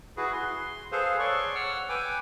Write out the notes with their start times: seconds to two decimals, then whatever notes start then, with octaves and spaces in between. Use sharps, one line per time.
0.17 E4 F#4 G#4 B4
0.33 C6
0.92 G#4 A4 B4 C5 F5
1.19 C#5 D5 C6 C#6
1.55 F#5 E6 F6
1.89 B4 G5 G#5 D6